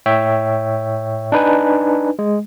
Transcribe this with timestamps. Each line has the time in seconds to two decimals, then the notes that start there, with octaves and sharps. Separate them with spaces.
0.06 A2 C#5 E5 G5
1.32 D4 D#4 B4 G#5
2.19 G#3